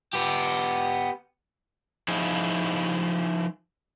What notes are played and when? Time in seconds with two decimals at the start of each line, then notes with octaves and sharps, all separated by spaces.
0.14 B3 G4
2.08 F3 D#4 E4 G#4